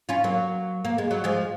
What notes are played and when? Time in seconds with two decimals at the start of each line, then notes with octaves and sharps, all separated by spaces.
0.09 C#4 F4
0.24 F#3 A#3
0.85 A#3
0.98 G#3
1.11 F#3
1.24 F3 G#3